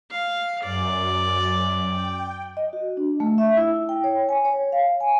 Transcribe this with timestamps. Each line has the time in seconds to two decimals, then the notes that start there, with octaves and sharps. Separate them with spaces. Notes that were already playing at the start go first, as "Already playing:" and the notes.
0.12 F5
0.63 F#2 D5
1.89 G5
2.57 D#5
2.73 F#4
2.97 D4
3.20 A3
3.38 E5
3.57 E4
3.89 G5
4.04 C#5
4.29 G#5
4.45 C#5
4.72 F5
5.01 G#5